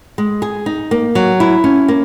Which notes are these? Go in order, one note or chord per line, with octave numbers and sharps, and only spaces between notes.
G#3
G#4
D#4
A#3
F#3
E4
C#4
A#3